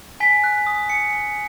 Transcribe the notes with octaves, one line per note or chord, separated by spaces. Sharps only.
G#5 B6
F#6
D#6
G#5 C#7
G#5